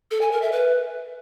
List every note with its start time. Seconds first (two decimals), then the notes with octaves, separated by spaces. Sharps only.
0.11 A4
0.21 G#5
0.32 A#4
0.42 E5
0.52 B4